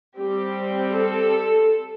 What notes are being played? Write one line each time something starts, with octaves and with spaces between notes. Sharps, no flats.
G3 C4 G4
A4